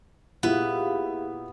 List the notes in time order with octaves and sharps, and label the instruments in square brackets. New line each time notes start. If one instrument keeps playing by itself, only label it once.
[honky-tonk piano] A#2 E4 [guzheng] B3 [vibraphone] G4 G#4 F5